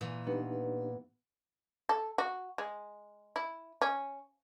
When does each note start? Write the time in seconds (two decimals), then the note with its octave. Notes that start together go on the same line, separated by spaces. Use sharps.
0.01 A#2 E3
0.27 B3 D4 D#4 G4
1.89 A4
2.18 F#4
2.58 G#3
3.36 E4
3.82 C#4